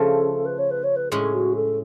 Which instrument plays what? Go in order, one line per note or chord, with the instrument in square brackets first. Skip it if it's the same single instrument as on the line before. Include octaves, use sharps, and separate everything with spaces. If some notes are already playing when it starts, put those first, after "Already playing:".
Already playing: [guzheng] C#3 F3 A3 F4 [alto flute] A4
[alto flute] B4
C#5
B4
C#5
B4
[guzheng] A2 G#3 C#4 [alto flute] G#4
[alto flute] F#4
A4